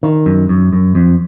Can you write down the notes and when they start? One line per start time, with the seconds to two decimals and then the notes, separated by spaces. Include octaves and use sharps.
0.03 D#3
0.26 F#2
0.49 F#2
0.73 F#2
0.95 F2